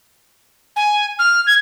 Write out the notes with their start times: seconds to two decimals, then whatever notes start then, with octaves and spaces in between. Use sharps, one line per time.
0.76 G#5
1.19 F6
1.47 G#6